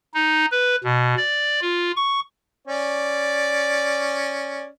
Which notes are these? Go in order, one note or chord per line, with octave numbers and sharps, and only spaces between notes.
D#4
B4
B2
D5
F4
C#6
C#4 D5